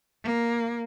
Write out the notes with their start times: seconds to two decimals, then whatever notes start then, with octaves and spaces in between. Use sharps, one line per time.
0.24 A#3